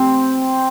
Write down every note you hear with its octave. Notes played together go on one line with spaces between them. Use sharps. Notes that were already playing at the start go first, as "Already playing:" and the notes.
Already playing: C4